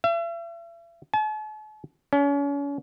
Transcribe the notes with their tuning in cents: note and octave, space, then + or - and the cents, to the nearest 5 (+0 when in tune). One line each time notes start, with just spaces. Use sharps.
E5 +40
A5 -45
C#4 +35